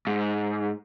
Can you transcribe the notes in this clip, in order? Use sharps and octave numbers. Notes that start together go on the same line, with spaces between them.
G#2